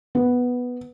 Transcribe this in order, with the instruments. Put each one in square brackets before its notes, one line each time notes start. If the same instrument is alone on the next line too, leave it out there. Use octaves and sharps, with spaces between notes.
[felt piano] B3